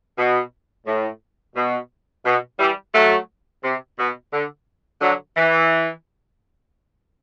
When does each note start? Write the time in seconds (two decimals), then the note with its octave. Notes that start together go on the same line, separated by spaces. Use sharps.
0.18 B2
0.86 A2
1.55 B2
2.25 B2
2.59 E3 G3
2.94 F#3 A3
3.63 C3
3.98 B2
4.33 D3
5.01 D3 F#3
5.36 E3